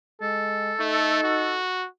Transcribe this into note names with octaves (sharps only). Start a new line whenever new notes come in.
G#3 A4
A3 D#4
F#4